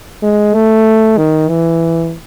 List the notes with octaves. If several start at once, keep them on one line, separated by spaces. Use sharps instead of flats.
G#3
A3
D#3
E3